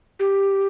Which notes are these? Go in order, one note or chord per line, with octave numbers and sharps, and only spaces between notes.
G4